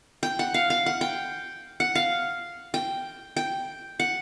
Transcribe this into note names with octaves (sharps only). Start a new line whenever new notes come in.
G5
F#5
F5
F5
F#5
G5
F#5
F5
G5
G5
F#5